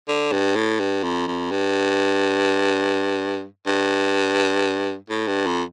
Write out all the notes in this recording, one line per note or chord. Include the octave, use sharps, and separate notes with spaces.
D3
G2
A2
G2
F2
F2
G2
G2
A2
G2
F2